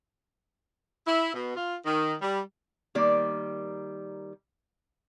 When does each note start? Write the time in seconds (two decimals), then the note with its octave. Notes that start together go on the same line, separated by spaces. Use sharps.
1.06 E4
1.34 B2
1.56 F4
1.85 D#3
2.22 G3
2.95 D#3 G3 A#3 D5